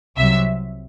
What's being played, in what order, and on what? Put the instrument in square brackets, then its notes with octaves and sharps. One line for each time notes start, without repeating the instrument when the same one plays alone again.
[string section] C2 C3 F#3 E5